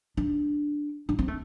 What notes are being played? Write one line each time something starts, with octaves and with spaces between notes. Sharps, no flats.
D4
D4
C4
A3